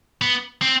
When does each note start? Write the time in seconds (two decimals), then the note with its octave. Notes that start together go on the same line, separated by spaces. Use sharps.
0.22 B3
0.62 C4